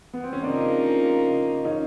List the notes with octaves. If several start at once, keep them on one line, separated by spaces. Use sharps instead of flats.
B3
C4
C#4
C#3 F3 A#3 C4 D4 D#4
C#4 D#4